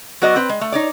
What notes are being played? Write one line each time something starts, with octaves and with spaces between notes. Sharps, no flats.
F#3 B3 F#4 D5 D#5
C4 B4
G#3
A3
D#4 C#5 D5